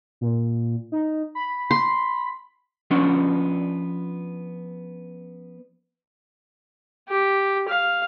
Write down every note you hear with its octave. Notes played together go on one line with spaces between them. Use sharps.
A#2
D#4
B5
C6
F3 B3 C#4 D4
G4
F5